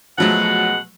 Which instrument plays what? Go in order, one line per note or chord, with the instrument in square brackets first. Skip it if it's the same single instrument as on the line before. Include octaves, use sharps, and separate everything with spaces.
[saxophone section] B2 G#3 F#5 [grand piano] F3 F#3 A3